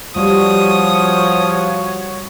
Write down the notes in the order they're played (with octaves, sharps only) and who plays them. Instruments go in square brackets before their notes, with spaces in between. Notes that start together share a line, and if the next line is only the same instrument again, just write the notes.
[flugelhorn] F3 [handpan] G3 [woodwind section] F#4 C#5 [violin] D#6